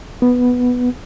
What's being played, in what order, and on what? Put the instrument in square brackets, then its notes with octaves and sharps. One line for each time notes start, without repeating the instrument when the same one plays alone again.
[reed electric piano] B3